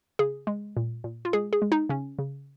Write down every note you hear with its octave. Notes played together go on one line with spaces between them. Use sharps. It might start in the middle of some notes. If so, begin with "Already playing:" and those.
C#3 G#4
G#3
A#2
A#2
F4
G#3 G#4
G#4
G#3
D#4
C#3 C#4
C#3